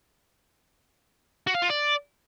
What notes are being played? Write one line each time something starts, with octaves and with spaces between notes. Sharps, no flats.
F#4
F5
F4
D5